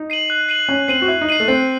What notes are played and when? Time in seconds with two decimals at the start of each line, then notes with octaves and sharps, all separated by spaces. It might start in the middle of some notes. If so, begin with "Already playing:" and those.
Already playing: D#4
0.10 C7 D#7 F#7
0.30 F#6
0.49 C7 D#7 F#7
0.69 C#4 F#6
0.88 C4 C7 D#7 F#7
1.02 F#4
1.08 E4 F#6
1.21 D#4
1.29 C7 D#7 F#7
1.40 A3
1.48 C4 F#6